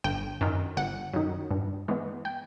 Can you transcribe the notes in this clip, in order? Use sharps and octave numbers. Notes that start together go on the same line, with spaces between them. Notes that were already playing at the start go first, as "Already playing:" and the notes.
G1 G5
F#2 D#3
G1 F#5
F#2 D#3
G2
E3 G#3 B3
G5